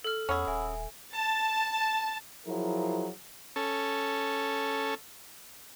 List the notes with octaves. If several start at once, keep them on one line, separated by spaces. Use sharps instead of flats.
A4 F6
E2 C#4 G#4 F#5 B5 E6
D#1 E5 G#5
A5
F3 F#3 E4 G#4 A#4
C#4 A4